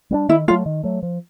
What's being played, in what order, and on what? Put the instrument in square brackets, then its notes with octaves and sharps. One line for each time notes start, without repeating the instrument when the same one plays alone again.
[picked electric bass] G3 B3 D4
[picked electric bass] D#3 [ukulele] E4
[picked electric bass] F#3 A3 [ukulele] F4
[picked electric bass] D#3
F#3 A3
F3